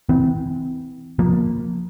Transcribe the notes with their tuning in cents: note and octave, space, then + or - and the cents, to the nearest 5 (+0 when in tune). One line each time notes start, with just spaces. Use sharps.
E3 -25 C4 -30
F3 +20 A#3 +0